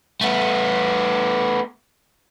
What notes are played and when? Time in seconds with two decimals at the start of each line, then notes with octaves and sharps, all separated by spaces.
0.21 A3 B3